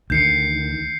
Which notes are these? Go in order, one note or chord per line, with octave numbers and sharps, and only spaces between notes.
D2 D#3 G6 C7 C#7